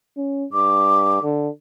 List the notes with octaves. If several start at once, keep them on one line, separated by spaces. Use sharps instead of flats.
C#4
G2 D6
D3